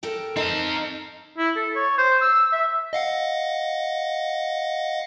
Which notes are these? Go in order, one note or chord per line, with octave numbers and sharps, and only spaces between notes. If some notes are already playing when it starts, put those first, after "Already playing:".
A4 A#4 G5
C4 D#4 F5 A5
E4
A4
C#5
C5
E6
E5
D#5 F5 F#5